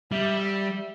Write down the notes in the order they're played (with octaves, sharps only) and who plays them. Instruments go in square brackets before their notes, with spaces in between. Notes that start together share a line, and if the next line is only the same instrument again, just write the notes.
[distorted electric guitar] G3 [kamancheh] E5